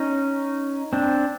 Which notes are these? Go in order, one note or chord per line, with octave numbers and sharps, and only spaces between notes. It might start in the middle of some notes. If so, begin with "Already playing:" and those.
Already playing: C#4 D#4
C4 D4